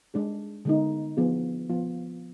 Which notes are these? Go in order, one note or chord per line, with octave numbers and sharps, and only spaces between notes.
G#3 D4 G#4
D3 G#3 B3 D#4
F3 B3 D4 F4 G#4
F3 B3 F4